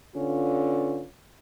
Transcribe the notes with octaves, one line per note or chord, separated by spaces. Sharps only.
D3 B3 C#4 F4